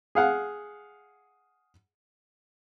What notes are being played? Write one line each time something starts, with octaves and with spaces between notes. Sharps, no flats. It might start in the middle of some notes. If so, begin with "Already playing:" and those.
G#4 F5 F#5